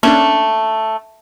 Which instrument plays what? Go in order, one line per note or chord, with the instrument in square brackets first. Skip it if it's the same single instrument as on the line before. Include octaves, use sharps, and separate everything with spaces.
[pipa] A3 [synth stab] A#3 C#4 D4